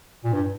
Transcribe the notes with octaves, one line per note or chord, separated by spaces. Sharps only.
A#2
G2